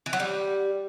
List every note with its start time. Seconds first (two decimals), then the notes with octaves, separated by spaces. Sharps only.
0.06 E3
0.13 F#3
0.20 G3